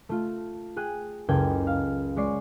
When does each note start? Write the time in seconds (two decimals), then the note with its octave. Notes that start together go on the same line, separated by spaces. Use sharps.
0.09 A3 F4
0.76 G#4 G5 F#6 D#7
1.28 F#1 C#2 A4 G5 G#6
1.67 F5
2.16 G#3 C#5 D5 C7